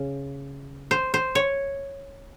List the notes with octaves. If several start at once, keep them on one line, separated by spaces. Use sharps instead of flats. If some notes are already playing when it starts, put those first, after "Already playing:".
Already playing: C#3
C5
C5
C#5